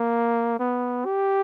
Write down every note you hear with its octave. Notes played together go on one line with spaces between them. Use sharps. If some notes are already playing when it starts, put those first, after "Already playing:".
Already playing: A#3
B3
G4